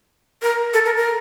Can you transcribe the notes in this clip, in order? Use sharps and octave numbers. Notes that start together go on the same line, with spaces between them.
A#4
A4
A#4
A#4